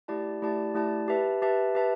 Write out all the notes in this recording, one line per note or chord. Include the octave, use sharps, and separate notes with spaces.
A3 E4 G4 D5 A5
A3 E4 G4 D5 A5
A3 E4 G4 D5 A5
G4 B4 E5 A5
G4 B4 E5 A5
G4 B4 E5 A5